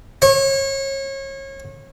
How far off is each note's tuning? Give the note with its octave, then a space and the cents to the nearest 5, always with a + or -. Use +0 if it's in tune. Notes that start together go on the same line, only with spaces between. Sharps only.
C#5 -30